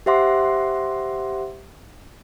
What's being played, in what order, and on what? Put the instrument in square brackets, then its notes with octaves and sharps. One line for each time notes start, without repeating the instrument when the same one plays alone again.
[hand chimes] G4 C5 E5 F#5 C6 D6